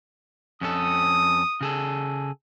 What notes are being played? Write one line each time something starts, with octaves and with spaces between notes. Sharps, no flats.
F2 C#4 A4 D#6
C#3 G#4 A4